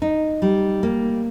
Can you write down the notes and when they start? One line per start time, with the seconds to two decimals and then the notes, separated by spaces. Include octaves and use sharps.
0.02 D#4
0.42 G3
0.83 A#3